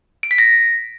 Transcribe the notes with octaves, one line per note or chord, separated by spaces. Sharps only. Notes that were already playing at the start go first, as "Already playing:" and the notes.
D7
B6
A#6